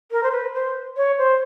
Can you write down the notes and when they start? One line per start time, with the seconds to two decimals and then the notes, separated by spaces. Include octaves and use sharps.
0.11 A#4
0.23 C5
0.32 B4
0.54 C5
0.97 C#5
1.18 C5